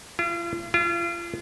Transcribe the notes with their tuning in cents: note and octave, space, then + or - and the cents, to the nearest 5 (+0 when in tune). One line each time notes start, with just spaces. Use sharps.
F4 -40
F4 -35